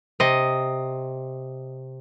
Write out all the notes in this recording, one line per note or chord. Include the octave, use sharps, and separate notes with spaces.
C3 D#5